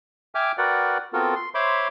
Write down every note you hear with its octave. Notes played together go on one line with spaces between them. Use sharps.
E5 G5 G#5 D6 F6
F#4 A#4 B4 D5 F#5 G5
B3 C4 F4 F#4 A4 A#4
C6
C5 C#5 E5 B5 C6 D6